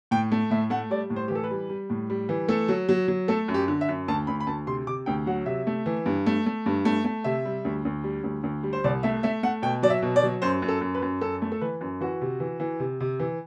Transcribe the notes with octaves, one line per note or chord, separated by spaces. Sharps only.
A2 G5
A3
A2 E5
A3 F#5
G3 D5
A2
C5
E3 G4
A4
B4
G3
G3
A2
G3
E3
A3 A4
F#3
F#3
F#3
A3 A4
F#2
G4
D3
E5
F#2
D2 A5
D2 B5
B5
D2 A5
C3 C6
C3 D6
D2 G5
F#3 F#5
C3 E5
A3
E3
G2
A3
A3
G2
A3
A3
C3 E5
G3
D2
D2
G3
D2
D2
G3
C5
C2 D5
A3 E5
A3 E5
A3 F#5
B2 G5
F#3 D5
E5
B2
D5
F#3
F#2 C5
F#2
A4
F#2
B4
F#2
F#2 A4
A3
A4
E3 B4
F#2
E3 F#4
C3
E3
E3
C3
C3
E3